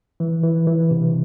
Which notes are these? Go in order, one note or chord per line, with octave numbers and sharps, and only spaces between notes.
E3
E3
E3
C3